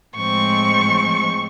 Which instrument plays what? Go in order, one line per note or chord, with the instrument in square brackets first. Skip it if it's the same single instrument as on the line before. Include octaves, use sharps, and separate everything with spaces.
[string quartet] A2 F3 G#3 C4 C#6